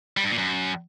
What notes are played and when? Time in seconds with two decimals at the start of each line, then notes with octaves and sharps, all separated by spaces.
0.17 G3
0.24 G2
0.31 A#2
0.38 F#2